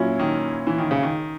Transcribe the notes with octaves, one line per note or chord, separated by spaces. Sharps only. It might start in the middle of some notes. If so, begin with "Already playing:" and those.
Already playing: A#2 F#3 C#4 E4
D#3
E3
D#3
C#3
D#3